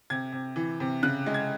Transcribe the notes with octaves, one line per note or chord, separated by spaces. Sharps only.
C3 G#6
C3
E3
C3
C#3 F#6
G#3
G#6